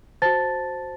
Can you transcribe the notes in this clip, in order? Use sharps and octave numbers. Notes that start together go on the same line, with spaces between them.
F#4 C5 A5 A6